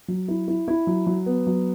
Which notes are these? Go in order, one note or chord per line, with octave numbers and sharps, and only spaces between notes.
F#3
E4
E4
E4
F#3
F#3
B3
F#3